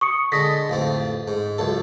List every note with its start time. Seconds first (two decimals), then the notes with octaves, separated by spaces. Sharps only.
0.01 C#6 D#6 C#7
0.32 D3 G#3 D4 D#6 A#6 B6
0.69 A1 F2 C4
1.28 G#2
1.58 C#2 F#2 A4